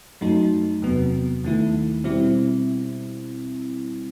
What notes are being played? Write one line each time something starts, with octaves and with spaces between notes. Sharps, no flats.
F#2 F#3 A3 D#4
E2 C3 F#3 B3
D#2 D#3 A3 E4
B2 G3 C4 E4